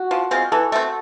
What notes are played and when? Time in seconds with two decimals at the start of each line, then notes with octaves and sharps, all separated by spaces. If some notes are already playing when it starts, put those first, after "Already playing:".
Already playing: F#4
0.11 F3
0.31 G#3 C4 F4
0.52 E3 A4
0.72 A3 C4